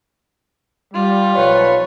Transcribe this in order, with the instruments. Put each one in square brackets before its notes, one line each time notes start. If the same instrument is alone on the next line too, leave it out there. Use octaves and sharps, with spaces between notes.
[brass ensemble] G3 [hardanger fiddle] F4
[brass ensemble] B1 F3 B4 [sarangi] C#5